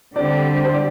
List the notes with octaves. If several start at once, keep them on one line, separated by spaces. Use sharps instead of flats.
D3 G3 C4 G4 D5
C5
D5